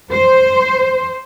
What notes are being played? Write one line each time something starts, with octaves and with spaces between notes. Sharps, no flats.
C5